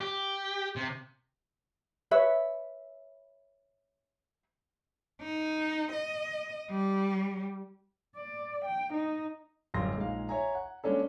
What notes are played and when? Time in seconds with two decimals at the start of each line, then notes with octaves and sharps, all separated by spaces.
0.01 G4
0.76 C3
2.11 B4 C#5 E5
5.21 D#4
5.92 D#5
6.70 G3
8.16 D5
8.65 G5
8.94 D#4
9.74 D1 F#2 G3 F5 C6 A#6
9.96 A#1 G#3 D#4 F5
10.29 C#5 E5 G#5 A#5
10.55 F#5
10.84 G#3 A#3 C#4 D4 A4